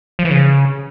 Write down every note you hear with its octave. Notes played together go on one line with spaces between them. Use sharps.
F3
E3
C#3